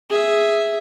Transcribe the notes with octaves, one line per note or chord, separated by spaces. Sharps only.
G#4 E5